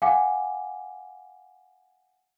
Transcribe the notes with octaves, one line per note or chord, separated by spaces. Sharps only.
F5 F#5 G#5 D6